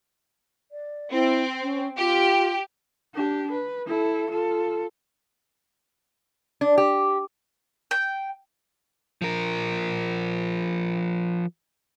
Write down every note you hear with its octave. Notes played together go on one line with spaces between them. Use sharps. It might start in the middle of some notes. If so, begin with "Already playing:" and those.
D5
C4 E4
C#4
F4 G4
D4 G4
B4
E4 A4
F4 A4
D4
G4
G5
F3 A#4